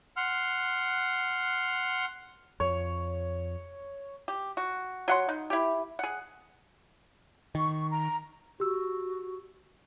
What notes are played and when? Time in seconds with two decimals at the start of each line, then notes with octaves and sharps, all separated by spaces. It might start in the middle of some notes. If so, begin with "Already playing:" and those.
0.17 F#5 C6 F6
2.60 F2 C#5
4.28 G4
4.57 F#4
5.08 F#3 F#5 C6
5.29 D#4
5.50 E4 G4
5.99 G#4 F#5
7.55 D#3 C#6
7.90 A#5
8.60 F#4 G4 E6